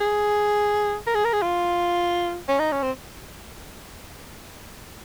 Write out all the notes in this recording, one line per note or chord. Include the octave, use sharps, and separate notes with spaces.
G#4
A#4
G#4
A#4
G#4
F4
C#4
D#4
C#4
C4